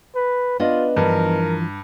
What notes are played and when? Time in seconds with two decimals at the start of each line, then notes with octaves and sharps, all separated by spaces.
0.15 B4
0.60 B3 D4 F4 D#5
0.96 G2 E3 F3 A#4